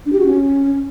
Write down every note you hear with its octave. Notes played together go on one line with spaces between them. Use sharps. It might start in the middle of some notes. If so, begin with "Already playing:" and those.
D4
G4
F#4
C#4